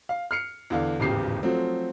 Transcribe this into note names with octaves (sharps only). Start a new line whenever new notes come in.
F5
F6 C7 C#7
E2 D3 F5
D1 G#1 E2 C#3 G4 C7
F3 F#3 A3 C4